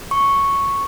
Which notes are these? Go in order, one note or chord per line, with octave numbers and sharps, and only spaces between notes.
C#6